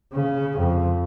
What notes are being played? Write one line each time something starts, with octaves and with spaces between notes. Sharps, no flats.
C#3
F2